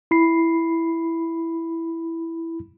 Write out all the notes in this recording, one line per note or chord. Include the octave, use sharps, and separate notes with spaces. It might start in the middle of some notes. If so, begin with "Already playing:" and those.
E4 B5 C7